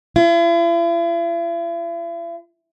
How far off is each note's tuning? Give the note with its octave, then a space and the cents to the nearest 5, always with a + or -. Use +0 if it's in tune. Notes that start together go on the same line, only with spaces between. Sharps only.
E4 +45